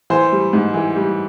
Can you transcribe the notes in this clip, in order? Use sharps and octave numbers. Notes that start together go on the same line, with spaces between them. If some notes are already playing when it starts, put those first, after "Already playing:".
E3 C5
G3
G#2
E3
G3